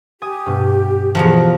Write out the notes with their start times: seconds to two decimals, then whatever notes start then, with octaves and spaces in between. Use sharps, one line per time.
0.22 G4 G#5 D#6
0.46 G2 B2
1.15 E2 B2 F3 F5 F#5 A#5